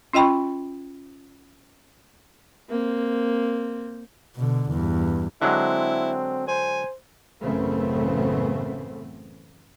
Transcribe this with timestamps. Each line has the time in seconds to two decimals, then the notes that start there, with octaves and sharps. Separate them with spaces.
0.13 C#4 F4 D#5 G5 B5 C#6
2.69 A#3 C4
4.36 B2 D3
4.71 E2 G2
5.42 D3 F#3 G#3 C4 E4
6.48 C5 G#5
7.41 A1 F#2 C#3 A3 B3 C4